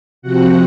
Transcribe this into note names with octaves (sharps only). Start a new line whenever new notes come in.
C3 F3 C4 F#4 F#5